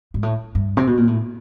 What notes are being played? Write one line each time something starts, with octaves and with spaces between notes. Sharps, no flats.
G#2
A2
G2
C3
B2
A#2
A2